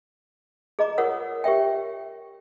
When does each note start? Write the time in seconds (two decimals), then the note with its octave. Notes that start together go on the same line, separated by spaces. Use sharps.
0.79 G#4 D#5 A#5 D6
0.98 F4 A#4 C#5 F#5 D#6 E6
1.44 G4 A#4 C#5 E5 G5